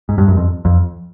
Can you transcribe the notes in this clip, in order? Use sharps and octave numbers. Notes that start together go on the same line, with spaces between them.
G#2
G2
F#2
F2
F2